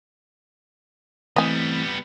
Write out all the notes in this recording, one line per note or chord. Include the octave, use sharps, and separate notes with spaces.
E3 G3 A3 B3 C4 D#5 G#5